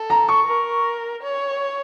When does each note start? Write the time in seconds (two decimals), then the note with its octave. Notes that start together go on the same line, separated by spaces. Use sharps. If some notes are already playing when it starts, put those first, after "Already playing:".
Already playing: A4
0.10 A#5
0.28 C#6
0.47 A#4
1.23 C#5